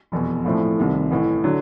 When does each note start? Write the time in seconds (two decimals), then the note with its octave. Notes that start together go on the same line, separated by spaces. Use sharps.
0.12 F1 E2 B2
0.45 A#1 A2 F3 A3 C4
0.78 C2 C3 D#3
1.11 A1 A2 E3
1.44 D3 F#3